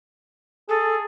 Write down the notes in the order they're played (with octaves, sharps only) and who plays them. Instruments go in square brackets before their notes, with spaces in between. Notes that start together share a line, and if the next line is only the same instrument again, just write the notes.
[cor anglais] G#4 [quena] A4